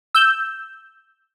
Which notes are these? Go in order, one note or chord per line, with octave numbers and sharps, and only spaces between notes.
E6 G6